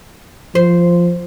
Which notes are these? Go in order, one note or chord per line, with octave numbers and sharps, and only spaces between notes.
F3 C5